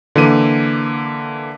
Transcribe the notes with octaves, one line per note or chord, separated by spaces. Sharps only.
D3 E3 A#3 D#7